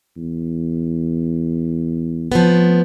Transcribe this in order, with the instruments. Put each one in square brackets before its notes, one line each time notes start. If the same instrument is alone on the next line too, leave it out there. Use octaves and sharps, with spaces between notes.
[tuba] E2
[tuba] F2 [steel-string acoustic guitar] F3 A3 B3